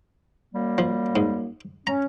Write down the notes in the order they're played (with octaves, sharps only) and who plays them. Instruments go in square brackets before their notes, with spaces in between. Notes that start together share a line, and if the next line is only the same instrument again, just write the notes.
[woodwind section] F#2 G3 A#3
[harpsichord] F3
G#2
[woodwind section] C#4 [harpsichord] A#5